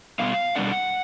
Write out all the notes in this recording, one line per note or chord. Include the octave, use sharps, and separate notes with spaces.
B2 G3 B3 F5
B2 G3 B3 D4 F#5